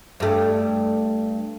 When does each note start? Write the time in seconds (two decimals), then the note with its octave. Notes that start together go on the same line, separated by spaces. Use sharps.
0.20 G2 A3